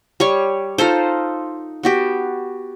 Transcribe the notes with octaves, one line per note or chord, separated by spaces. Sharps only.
G3 C#5 C#6
D#4 F4 A4 C5
B3 F#4 G4